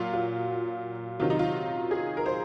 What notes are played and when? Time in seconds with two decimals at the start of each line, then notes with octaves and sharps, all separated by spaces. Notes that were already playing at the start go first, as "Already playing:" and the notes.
Already playing: A#2 F#3 F4
0.13 F4
1.20 C3 D#3 F#3 F4
1.30 D#4
1.39 F4
1.91 G#4
2.17 A#4
2.26 C5